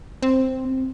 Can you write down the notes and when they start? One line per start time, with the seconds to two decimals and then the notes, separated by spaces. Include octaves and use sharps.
0.22 C4